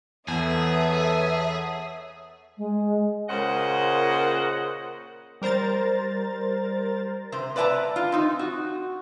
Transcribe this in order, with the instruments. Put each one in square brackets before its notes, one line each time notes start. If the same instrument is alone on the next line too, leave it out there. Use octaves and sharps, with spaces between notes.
[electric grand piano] E2 [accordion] B3 A4 [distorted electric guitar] G#4 [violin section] C#5 E5 D#6
[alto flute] G#3
[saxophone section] A#2 C#3 C5 D#5 F#5
[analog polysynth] G3 A#4 C5 A#5 A6
[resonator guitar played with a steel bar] C3 C5
B4 D5 E5 G5 A5 A#5
F4
C4 D#4
F#4